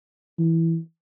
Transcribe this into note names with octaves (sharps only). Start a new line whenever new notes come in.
E3